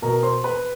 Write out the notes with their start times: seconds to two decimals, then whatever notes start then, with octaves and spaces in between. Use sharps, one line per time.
0.02 B2 A#4 A#5
0.23 C5 C6
0.44 B4 B5